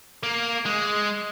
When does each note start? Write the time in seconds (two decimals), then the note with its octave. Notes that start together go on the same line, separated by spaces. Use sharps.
0.23 A#3
0.66 G#3